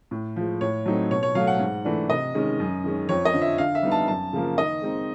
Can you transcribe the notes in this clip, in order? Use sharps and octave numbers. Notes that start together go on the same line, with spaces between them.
A2
F3 G#3
A2 C#5
F#3 A3 C4 D#4
B2 C#5
C#5
F#3 A3 F5
F#5
G#2
E3 A3 D4
C3 D#5
D#3 G#3 C#4
F#2
D#3 G#3 C#4
F2 C#5
D#5
D3 F3
E5
D3 F5
E5
G3 B3 D#4
A5
F#2 A5
C#3 F3 A#3
D#3 D#5
G#3 C4 D#4